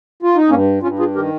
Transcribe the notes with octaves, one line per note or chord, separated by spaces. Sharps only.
F4
D#4
G2 A#3 C#4
G2 C#4 F4
F4 G#4
D#3 G4 A#4